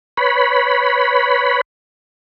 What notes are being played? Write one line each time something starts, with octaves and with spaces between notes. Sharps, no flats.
B4 C#5 B5